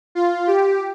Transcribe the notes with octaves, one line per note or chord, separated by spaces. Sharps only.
F4
G4